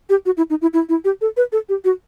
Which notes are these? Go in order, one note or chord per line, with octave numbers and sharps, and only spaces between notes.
G4
F#4
E4
D#4
E4
E4
E4
G4
A4
B4
A4
G4
F#4